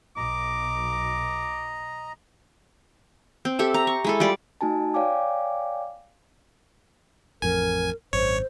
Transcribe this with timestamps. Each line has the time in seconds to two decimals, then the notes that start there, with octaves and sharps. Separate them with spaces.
0.17 B1 D#5 A#5 D6
3.45 C4
3.59 G4 A4 E5
3.74 A#5
3.87 C#6
4.04 G#3 E4 A4
4.20 G3 F4 D5
4.61 A3 D#4 F#4 G#5 A5
4.94 C#5 D5 F5 G5 G#5 D6
7.42 A1 F2 A#4 G#5
8.13 G#1 F#2 C5 C#5